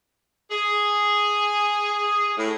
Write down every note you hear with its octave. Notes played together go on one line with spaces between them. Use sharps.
G#4
A2